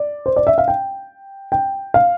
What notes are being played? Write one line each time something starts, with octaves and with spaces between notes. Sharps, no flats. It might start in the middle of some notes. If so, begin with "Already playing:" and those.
Already playing: D5
C5
D5
E5
F5
G5
G5
F5